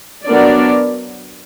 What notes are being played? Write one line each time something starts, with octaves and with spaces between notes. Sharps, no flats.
F#3 B3 D4 A#4 D5